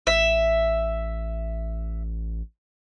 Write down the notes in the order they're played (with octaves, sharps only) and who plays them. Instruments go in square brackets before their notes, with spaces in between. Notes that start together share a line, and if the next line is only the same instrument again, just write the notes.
[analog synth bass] A1 [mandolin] E5